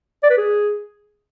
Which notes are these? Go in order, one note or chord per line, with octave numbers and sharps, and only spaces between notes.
D5
B4
G#4